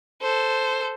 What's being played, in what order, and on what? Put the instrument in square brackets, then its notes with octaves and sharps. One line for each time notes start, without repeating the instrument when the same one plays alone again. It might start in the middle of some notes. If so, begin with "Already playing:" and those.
[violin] A4 C5